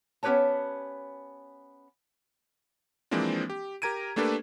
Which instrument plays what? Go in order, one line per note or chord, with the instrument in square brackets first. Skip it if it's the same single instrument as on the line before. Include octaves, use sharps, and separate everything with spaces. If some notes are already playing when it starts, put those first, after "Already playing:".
[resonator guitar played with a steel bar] B3 C#4 G4 B4 C#5 A5
[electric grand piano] E3 F3 G#3 A#3 C4 D4
G4
G4 A#4 A#5 G#6 D7 D#7
A3 A#3 D4 G4 A4 B4